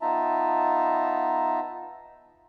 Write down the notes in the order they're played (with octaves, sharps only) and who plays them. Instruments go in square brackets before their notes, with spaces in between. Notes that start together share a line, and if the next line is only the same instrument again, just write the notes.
[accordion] B3 D#4 F4 E5 A5 A#5